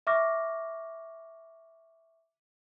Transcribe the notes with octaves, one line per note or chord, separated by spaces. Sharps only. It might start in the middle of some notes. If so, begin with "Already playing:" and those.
E5 C#6 D6 F6 A#6